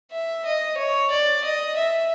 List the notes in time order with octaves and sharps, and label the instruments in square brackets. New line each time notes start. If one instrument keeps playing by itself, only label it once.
[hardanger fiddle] E5
D#5
C#5
D5
D#5
E5